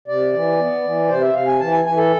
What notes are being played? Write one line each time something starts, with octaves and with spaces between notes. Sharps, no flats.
C3 D5
E3
B3
E3
C3 C5
E5
C3 F5
G#5
E3 A5
G#5
E3 G#5
A4